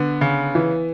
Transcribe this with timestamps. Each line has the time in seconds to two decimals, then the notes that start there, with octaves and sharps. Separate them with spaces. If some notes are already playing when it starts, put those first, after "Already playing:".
Already playing: D3 B3
0.21 C#3
0.55 E3